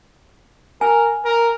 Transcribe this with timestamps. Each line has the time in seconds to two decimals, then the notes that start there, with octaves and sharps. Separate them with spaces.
0.81 A#4 G#5
1.25 A#4